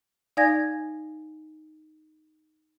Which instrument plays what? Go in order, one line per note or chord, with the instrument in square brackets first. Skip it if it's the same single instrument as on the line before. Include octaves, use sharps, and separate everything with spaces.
[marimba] D#4 D5 F5 G#5 G#6 A#6